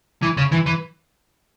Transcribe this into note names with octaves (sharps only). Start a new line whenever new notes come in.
E3
C#3
E3
E3